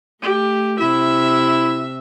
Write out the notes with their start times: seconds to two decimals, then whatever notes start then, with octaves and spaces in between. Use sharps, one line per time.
0.23 A3 G4
0.80 C3 E4 E5